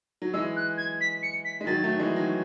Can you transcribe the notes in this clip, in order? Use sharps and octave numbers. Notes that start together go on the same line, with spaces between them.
F#3
E3 G#3 E6
F#6
G#6
B6
C#7
B6
G#3
D#3 F#3 A6
F#3 A3
E3 G#3
D#3 F#3